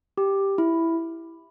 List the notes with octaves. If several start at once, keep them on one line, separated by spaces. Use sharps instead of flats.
G4
E4